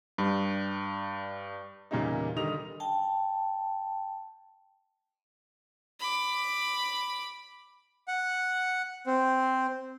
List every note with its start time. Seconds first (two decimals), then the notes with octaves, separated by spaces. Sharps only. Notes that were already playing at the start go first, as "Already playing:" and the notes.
0.18 G2 G3
1.91 E2 A#2 C#3 G3 A#3 D#4
2.36 D3 D#3 G3 D#5 D#6 F7
2.80 G5 A5
6.00 B5 D6
8.08 F#5
9.07 C4